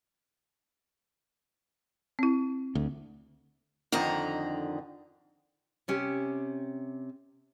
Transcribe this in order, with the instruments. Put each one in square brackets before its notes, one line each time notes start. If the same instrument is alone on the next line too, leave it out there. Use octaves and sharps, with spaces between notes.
[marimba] C4 E4
[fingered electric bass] D2
[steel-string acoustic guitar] F2 D3 D#3 D#5 A#5
[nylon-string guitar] C3 C#4 G4